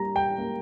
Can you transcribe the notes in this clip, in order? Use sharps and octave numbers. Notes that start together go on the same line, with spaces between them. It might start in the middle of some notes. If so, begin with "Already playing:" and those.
Already playing: G3 A#3 A#5
G5
A#3